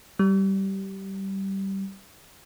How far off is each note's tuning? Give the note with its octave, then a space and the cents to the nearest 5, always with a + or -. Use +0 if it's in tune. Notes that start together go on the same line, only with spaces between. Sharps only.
G3 -15